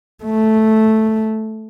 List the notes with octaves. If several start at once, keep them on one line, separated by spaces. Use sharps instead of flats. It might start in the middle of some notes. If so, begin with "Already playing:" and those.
A3